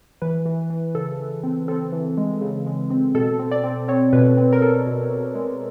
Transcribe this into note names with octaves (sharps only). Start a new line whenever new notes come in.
E3 B4
E3
E3
C#3 A4
E3
C4
C4 A4
E3
G#3
C#3
G#3
C4
B2 A4
C4
D5
C4
C4 C#5
B2 B4
C4
A#4
B2 A4
B2
B2
G#3